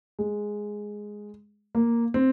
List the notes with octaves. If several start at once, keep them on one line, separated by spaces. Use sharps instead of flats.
G#3
A#3
C4